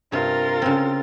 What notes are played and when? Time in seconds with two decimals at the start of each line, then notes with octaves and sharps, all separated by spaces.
0.12 G2 C3 F4 A#4 A6
0.62 C#3 C4